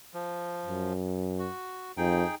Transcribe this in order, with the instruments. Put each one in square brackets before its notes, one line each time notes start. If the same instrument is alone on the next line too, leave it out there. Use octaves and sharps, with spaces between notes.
[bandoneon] F3
[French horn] F#2
[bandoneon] F#4
[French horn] F2 [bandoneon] D#4 G#4 G5